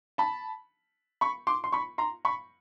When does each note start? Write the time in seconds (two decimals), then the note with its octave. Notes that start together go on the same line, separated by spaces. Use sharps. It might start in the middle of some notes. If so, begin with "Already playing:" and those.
0.18 A5 B5
1.21 B5 C#6
1.47 C6 D6
1.64 C6
1.72 B5 C#6
1.98 A#5 C6
2.25 B5 C#6